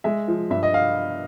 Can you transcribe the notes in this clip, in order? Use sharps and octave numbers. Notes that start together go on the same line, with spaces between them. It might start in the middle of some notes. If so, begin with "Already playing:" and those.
G#3 E5
F3
G2 E5
D#5
F5